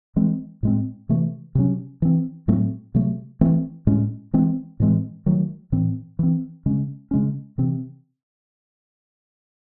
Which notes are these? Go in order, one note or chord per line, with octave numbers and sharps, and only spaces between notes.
E3 G#3 C4
A2 G#3 C4
C3 E3 A3
C3 F#3 C#4
E3 C4
A2 F#3 A3 C4
C3 F#3 A3
E3 A3 C4
A2 G#3 C#4
E3 G#3 C4
A2 E3 G#3 C4
D#3 F#3 A3
A2 E3 C4
E3 C4
C#3 G#3 C#4
C#3 G#3 C#4
C3 E3 C4